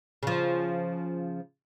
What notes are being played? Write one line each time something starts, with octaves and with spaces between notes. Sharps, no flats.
C#3 F3